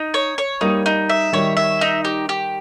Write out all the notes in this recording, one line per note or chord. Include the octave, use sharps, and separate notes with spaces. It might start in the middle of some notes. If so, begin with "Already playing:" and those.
Already playing: D#4
C#5
C#5
G3 A#3 D#4
D#4
E5
D#3 G3 C#5
E5
D#4
G4
G4